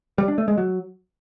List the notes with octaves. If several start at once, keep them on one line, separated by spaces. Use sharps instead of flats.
G3
D4
A3
G#3
F#3